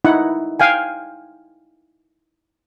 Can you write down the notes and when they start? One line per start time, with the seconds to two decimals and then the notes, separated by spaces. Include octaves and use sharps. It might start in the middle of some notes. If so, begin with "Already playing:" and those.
0.05 D#4 E4 F#5
0.60 F5 G5 G#5